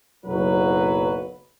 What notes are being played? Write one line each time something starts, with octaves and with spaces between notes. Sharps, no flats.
F#1 B1 F#3 B4